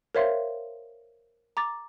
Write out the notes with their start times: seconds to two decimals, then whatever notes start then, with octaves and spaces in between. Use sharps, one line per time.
0.15 A#4 C5 C#5 E5 F5 C6
1.57 A#5 D6 A6